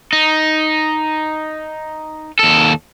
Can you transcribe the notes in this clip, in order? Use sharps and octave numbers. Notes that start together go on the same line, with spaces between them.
D#4
D#2 A4